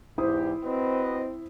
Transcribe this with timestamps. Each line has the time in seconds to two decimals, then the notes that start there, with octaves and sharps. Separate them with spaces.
0.18 E2 G#2 E4 G4 C5 D#6
0.65 C4 F#4 B4 D#5